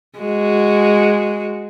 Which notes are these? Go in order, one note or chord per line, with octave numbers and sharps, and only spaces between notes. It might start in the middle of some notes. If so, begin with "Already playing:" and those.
G#3 F#4